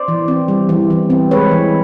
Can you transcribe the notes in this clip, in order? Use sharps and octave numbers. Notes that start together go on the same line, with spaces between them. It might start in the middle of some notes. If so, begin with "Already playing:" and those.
Already playing: C5 D5
E3
C4
G3
E3
E3
C4
G#3 B4 C#5
E3